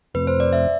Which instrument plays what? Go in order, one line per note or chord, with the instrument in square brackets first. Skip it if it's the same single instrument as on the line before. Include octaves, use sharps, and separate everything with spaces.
[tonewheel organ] F2 C3 F3 A3 C4 [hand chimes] B4
[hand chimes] C5
D5
E5